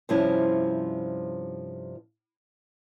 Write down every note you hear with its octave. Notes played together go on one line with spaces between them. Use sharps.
G2 C3 F3 C#4 E4